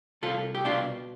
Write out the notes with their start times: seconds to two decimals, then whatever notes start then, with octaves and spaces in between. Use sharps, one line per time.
0.22 C2 F4 A4
0.55 G4
0.65 B2 D4 F4